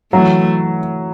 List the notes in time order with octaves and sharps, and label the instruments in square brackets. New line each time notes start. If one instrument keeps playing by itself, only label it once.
[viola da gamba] E3 A3 [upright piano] F#3